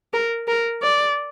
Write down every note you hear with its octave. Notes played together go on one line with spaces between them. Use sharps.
A#4
A#4
D5